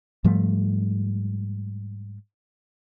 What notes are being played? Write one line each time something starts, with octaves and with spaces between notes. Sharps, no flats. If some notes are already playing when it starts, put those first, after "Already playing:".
G#2 F3 G3 A3